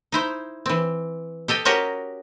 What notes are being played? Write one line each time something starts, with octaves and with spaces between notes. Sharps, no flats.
D#4 E4 C5
E3 C4
G4 A4 D#5 G5
C#4 F#4 G4 A#4 C#5 D#5